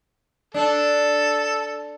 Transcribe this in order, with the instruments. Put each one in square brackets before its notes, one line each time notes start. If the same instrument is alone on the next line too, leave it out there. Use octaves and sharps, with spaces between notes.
[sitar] D4 [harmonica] A4